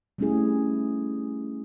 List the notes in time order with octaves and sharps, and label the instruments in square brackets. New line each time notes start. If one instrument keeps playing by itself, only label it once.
[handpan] G3 A3 C#4 D4 E4 G#4